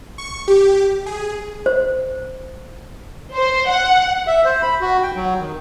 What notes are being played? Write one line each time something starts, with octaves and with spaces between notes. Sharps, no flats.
C#6
G4
G#4
C5
C5
F#5
E5
C5
B5
F#4
G5
F#3
D#3